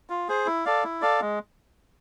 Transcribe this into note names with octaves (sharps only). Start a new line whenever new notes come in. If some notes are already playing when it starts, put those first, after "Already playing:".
F4
G#4 C5
E4
A4 D5 F5
E4
A4 D5 F5
G#3